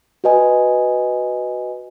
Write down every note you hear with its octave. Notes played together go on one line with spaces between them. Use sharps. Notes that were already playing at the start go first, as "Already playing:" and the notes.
F#4 B4 D#5 G#5